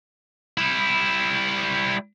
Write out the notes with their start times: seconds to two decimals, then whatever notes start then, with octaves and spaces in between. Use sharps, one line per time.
0.58 G3 E4